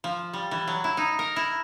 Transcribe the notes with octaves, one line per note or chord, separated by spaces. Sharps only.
F3
G3
E3
F#3
E4
D#4
A#4
E4